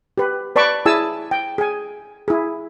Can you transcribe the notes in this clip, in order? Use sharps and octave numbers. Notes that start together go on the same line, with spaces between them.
G4 B4
B4 D5 A5 B5 C#6 D6
E4 G#4 G#5 A5 E6
G5
G#4 G#5
E4 G#4